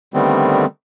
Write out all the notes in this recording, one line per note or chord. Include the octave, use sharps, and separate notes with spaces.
D3 D#3 G3 A3 B3 C4